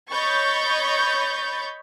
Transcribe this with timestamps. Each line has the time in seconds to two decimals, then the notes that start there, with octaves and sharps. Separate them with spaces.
0.11 C#5 D#5 B5 C#6 G6 A6